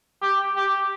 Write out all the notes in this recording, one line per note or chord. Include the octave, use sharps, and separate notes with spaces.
G4
G4